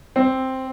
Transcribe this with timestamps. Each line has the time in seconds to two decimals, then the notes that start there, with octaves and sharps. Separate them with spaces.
0.16 C4